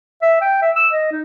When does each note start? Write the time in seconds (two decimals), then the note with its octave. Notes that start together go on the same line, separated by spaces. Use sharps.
0.22 E5
0.41 G5
0.62 E5
0.76 E6
0.92 D#5
1.11 D#4